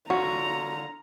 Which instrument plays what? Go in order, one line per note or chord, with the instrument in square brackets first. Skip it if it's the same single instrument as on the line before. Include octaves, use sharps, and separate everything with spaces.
[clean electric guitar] D3 F4 C#5 [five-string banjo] F#4 [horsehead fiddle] A#5